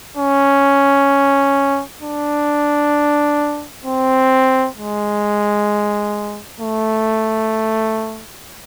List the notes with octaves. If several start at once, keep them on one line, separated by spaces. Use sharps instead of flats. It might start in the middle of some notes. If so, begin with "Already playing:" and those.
C#4
D4
C4
G#3
A3